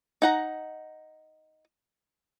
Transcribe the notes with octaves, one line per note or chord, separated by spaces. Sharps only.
D#4 F#5 A#5